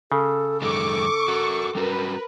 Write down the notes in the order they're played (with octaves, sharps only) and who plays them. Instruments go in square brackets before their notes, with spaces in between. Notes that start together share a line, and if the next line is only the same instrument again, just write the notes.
[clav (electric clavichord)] C#3 [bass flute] A4
[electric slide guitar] F#2 D#3 G#3 [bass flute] A4 [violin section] C#6 D6
[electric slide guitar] F#4 A#4
[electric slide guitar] G3 C#4 F#4 [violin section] A#4 B4